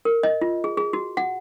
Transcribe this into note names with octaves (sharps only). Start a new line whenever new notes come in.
A#4
D#5
F4
G#4
G#4
F#4
F#5